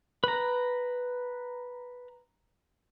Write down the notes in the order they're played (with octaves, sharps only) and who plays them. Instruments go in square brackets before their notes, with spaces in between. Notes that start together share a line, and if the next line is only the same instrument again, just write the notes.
[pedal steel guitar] B4 A#5